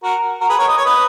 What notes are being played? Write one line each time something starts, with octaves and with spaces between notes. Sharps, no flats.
F#4 A#4
F#4 A#4
G#4 B4
A#4 C#5
D#5
C#5
B4 D#5